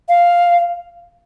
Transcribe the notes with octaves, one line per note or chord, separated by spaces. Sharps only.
F5